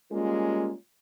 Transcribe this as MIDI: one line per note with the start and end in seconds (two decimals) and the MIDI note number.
0.12 0.73 55
0.12 0.73 56
0.12 0.73 58
0.12 0.73 61
0.12 0.73 65